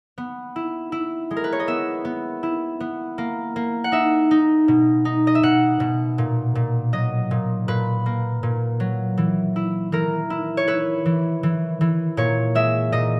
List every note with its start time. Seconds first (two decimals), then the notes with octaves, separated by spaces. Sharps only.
0.18 B3
0.56 E4
0.92 E4
1.31 G#3
1.37 A#4
1.44 B4
1.52 C#5
1.60 D#5
1.67 B3 E5
2.05 B3
2.43 E4
2.80 B3
3.18 A#3
3.56 A#3
3.84 F#5
3.92 D#4 E5
4.31 D#4
4.68 B2
5.05 D#4
5.27 D#5
5.35 E5
5.43 B2 F#5
5.80 B2
6.18 A#2
6.55 A#2
6.93 F#3 D#5
7.31 A#2
7.68 A#2 B4
8.06 A#3
8.43 A#2
8.80 F#3
9.18 E3
9.56 E4
9.92 E3 A#4
10.30 E4
10.57 C#5
10.68 E4 B4
11.06 E3
11.43 E3
11.81 E3
12.17 A#2 C#5
12.55 G#3 E5
12.92 A#2 D#5